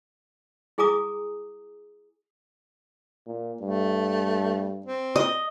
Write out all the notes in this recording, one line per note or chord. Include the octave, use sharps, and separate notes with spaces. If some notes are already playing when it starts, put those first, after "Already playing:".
E4 G#4 G#5 A#5 D6 D#6
A#2
G2 A3
C4
D#5